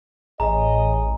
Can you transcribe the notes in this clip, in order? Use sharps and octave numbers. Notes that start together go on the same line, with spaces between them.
A1 G#4 C#5 D#5 A#5